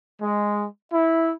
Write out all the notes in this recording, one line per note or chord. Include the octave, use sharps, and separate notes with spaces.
G#3
E4